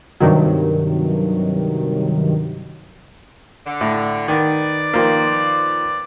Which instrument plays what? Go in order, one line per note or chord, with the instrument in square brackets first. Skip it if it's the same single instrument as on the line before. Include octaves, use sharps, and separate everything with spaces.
[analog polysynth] G2 C3 D#3 F#3
[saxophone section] D3
[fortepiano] A2
[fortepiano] D#3 [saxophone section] B4 D5
[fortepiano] D#3 F3 A#3